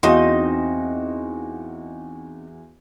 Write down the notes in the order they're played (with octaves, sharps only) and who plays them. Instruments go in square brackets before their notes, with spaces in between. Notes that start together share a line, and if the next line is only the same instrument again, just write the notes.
[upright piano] E2 F#4 F5 [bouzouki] C4 D#4 D#5